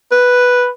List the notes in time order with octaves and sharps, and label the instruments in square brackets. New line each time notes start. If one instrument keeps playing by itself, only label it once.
[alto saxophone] B4